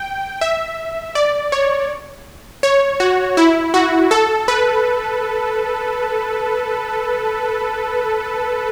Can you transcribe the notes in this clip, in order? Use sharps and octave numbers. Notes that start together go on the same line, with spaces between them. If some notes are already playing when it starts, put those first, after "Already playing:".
Already playing: G5
E5
D5
C#5
C#5
F#4
E4
F#4
A4
B4